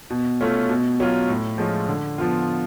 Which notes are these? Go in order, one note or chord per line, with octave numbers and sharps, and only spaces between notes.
B2
A3 C#4 F4
B2
F#3 C#4 F4
A2
F3 G#3 C#4 F4
D3
F3 B3 F4